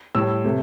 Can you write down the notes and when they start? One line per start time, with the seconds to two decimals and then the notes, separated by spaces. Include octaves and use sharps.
0.15 A2 G3 E6
0.44 C3 A3